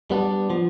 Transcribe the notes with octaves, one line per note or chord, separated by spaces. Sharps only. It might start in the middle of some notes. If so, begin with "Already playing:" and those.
G3 B3 D4
F3